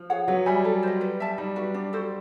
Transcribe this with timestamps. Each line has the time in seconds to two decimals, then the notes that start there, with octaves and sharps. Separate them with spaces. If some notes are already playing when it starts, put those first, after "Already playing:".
Already playing: F3
0.10 G#4 C#5 F#5
0.28 F#3 B4
0.46 G3 E5 G#5 B5
0.65 A4
0.83 C5 D#5
1.01 B4
1.20 E5 A5
1.38 G3 D#4
1.56 F#4 B4
1.74 D4
1.93 F#4 A4 C5